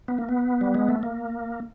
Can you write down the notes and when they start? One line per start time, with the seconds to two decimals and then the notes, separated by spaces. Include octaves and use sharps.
0.08 B3
0.18 A#3
0.29 B3
0.61 G3
0.75 G#3
0.89 A3
1.03 A#3